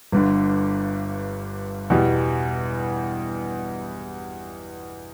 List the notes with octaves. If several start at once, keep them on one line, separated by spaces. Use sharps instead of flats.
G1 G2 D3
E2 B2 G3